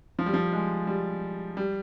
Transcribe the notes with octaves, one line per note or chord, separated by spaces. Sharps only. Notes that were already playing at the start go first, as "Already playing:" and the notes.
F3
G3
F3
G#3
G3
G3